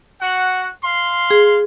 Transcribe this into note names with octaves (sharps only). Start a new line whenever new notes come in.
F#4 F#5
F5 C6
G#4